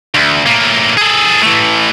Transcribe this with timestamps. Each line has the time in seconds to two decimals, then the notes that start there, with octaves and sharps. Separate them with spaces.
0.15 D2
0.47 A2 A#3
0.98 G#4 A4
1.42 E3 A3